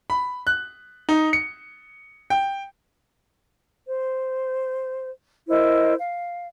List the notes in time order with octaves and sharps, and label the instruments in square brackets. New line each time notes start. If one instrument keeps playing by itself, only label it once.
[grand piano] B5
F#6
D#4
C#7
G5
[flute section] C5
E4 A#4 C5 D#5
F5